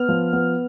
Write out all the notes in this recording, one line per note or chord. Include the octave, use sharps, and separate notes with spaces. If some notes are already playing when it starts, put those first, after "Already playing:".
Already playing: B3 F6
F3
B3